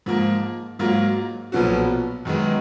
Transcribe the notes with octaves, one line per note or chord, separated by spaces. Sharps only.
G#2 F3 A#3
G#2 F#3 A#3 F4
B1 A#2 F3 B3 F#4
F#2 D#3 G#3 B3